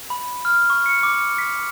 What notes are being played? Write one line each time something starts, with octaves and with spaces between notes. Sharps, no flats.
B5
F6
C#6
C#7
D6
B6